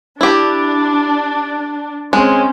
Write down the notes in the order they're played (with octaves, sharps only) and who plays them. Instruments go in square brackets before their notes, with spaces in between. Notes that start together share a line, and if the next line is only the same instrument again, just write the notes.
[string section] D4 [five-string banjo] E4 G4
[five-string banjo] G#3 [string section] C4 C#4